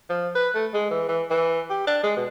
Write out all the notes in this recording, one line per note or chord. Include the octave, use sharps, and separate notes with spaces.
F3
B4
A3
G#3
E3
E3
E3
G4
D4
G#3
B2